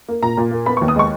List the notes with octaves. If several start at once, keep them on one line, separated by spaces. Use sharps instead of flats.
A#3
A#2 A#5
A#2
A#3
B3 B5
C#6
D#2
D#6
G#3 C#6